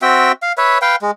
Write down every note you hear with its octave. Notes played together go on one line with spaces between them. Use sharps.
C4 F#4 E5 G5
F5
B4 C#5 E5
B4 F5 G5
G#3